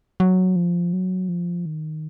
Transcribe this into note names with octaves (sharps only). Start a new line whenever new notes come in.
F#3
F3
F#3
F3
D#3